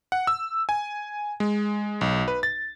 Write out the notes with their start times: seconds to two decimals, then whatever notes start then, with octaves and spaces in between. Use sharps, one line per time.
0.12 F#5
0.27 E6
0.69 G#5
1.40 G#3
2.01 B1
2.28 B4
2.43 A6